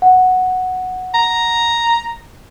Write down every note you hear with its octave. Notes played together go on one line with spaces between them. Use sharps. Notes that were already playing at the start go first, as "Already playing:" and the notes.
F#5
A#5